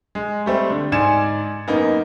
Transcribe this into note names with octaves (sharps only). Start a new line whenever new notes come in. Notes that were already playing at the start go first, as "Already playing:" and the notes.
G#3
G3 A3 C4
D3
G#2 D5 G#5 G#6 C#7 E7
F#2 A#3 B3 D#4